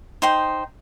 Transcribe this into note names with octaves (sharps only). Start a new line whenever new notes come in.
D#4 C5 G5